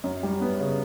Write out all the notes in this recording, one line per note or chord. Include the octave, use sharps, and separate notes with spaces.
F#2
G3
B3
C#3